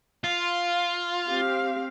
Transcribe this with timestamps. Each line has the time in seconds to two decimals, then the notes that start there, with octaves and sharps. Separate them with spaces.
0.24 F4
1.26 C4 G4 F5